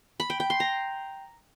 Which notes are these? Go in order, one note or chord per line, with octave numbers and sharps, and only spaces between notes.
B5
G5
G5
C6
A#5